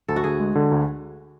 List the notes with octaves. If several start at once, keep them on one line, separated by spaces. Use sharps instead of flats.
D2 A4
F#4
D2 G#4
G#3
D3
D2